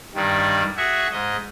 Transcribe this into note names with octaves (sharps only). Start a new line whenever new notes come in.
G2 D#3 G3
F#4 G#4 E5 C#6
G#2 D#5